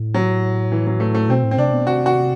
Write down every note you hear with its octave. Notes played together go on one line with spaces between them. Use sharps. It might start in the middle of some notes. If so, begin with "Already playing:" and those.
Already playing: A2
F#3
E3
F#3
A3
A3
B2 C4
A2
C4
C3 D4
B2
C3 F#4
F#4